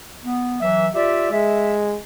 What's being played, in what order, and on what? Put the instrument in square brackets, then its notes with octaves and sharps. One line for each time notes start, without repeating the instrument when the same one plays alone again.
[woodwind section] B3
[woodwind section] E3 F#3 [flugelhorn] E5
[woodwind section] F4 G4 D5 [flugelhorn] E5
[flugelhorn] G#3 [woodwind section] E5